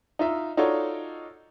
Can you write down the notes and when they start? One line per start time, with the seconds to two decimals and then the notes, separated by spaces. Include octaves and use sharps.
0.19 D#4 F4 E5
0.57 D#4 F4 F#4 A4 C#5 D5